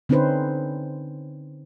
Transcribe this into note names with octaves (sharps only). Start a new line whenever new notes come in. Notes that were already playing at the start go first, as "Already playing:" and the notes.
D3 C4 C#4 D#4 B4 C5